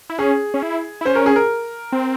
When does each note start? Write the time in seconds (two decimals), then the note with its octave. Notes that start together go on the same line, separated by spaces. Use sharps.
0.10 E4
0.18 C#4 G#4
0.54 C#4
0.63 E4
1.01 E4
1.05 C#4 C5
1.15 A#4
1.26 G#4
1.36 A#4
1.92 C4